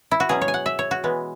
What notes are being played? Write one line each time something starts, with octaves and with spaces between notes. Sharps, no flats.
E4
F#4
B2 F#3 C#4 G#4
C#5
G#5
F#5
E5
C#5
F#4
E3 G#3 B3